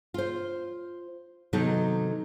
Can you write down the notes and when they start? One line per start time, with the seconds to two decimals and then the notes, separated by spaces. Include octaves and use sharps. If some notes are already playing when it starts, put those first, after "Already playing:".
0.14 F4 C5
1.53 C3 D#3 F#3 B3 D#4 A4